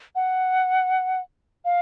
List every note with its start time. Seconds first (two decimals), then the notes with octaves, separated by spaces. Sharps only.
0.15 F#5
1.65 F5